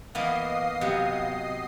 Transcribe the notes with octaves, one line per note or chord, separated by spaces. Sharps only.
E3 A#3 B3 D#5 F5 D#6 C7
C3 F#3 B3